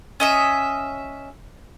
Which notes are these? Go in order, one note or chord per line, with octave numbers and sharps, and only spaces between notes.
C#4 D#5 E5